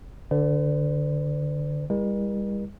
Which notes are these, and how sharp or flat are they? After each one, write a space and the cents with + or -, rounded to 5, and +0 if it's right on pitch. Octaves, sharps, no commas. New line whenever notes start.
D3 +5 B4 +45 D5 -10
G3 +45 E4 +0 A#4 +45